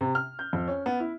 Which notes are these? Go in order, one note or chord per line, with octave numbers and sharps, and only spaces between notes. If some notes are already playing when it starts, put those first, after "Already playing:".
C3
F6
G6
F2
C#4
B3
E4